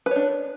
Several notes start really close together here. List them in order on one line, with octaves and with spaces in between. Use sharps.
B4 C#5 D4